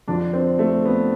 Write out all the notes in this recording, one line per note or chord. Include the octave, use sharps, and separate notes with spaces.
F2 D3 F3 D4
C4
A3
B3